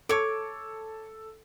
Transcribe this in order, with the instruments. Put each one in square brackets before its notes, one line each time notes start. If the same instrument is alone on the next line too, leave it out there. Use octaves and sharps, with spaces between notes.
[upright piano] A4 [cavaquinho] C#5 D6